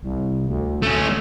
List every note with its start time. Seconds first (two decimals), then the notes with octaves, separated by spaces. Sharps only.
0.03 C2
0.48 D2
0.82 A3 C#4